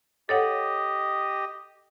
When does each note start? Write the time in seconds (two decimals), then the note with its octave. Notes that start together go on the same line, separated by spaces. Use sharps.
0.29 G4 A4 C#5 D#5 F#5